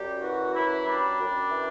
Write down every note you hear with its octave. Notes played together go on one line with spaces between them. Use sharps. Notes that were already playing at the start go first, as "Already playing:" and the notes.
Already playing: F#2 G3 G4
E3 F#4
F#2 E4
G3 D4
F#2
E3